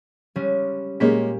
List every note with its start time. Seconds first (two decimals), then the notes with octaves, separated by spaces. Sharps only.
0.36 G3 G#3 C#4
1.00 A#2 G#3 A#3 C#4 G4 B6